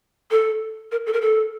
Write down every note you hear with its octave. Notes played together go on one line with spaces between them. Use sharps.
A4
A#4
A4
A#4
A4